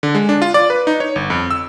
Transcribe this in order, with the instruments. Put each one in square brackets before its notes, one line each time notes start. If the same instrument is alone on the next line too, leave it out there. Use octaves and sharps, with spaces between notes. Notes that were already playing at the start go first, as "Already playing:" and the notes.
[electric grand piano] D3
G#3
D4
F4
D5
B4
D#4
C#5
G1
F2
E6